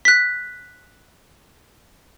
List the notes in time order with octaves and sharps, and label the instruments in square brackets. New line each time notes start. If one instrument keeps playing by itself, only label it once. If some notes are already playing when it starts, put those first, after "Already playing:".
[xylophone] F#6 B6